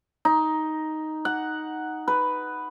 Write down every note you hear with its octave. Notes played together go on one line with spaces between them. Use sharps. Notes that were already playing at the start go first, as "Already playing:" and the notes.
D#4
F#5
B4